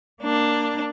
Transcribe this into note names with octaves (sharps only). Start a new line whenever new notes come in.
A#3 D4